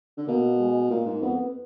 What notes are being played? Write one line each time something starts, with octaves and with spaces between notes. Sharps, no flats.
D3
B2 A#3
G#3
A#2 A#3
G#2
F2 B3